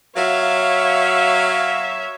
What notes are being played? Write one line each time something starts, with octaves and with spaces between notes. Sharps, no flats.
F#3 C#5 E5 F5